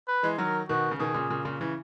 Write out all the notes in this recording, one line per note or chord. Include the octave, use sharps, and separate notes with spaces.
B4
E3 G#3
D#3 F#3 A#4
B2 D#3 F#4
C#3
B2 D#3 G#4
A#2 C#3
A#2 C#3
A#2 C#3
C#3 E3